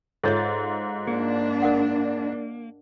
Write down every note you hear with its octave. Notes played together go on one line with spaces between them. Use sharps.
G#2 F4 A4 C#5 E5 A6
A#3 D4 G#4
A#4 F5 F#5